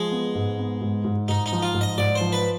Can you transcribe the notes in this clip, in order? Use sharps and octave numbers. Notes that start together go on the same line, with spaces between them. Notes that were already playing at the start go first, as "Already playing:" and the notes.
Already playing: F3 G#3
B3
G#2
B3
G#2
G#2
G#2 D#4
D#4
F3
F4
G#2
D#5
G#2 D5
C5
F3
B4